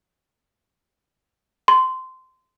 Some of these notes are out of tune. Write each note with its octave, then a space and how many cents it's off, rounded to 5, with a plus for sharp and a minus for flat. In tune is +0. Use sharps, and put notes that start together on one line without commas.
C6 -15